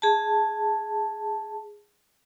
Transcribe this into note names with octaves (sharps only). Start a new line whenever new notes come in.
G#4 A5